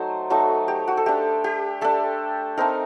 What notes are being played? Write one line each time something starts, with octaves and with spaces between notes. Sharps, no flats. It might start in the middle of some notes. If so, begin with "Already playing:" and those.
Already playing: F#3 A3 D#4 C5
F#3 A3 D#4
G4
F#4
A4
A3 D4 G4
G4
A3 D4 A4
A3 C4 D#4 A#4